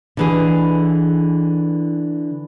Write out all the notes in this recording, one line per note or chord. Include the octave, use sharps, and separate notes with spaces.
D3 E3 G#4